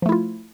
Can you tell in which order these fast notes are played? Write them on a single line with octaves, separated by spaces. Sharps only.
F3 A3 E4 F4